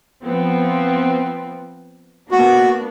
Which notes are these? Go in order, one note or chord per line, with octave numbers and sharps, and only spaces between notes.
F3 B3 C4
A#3 B3 D4 F#4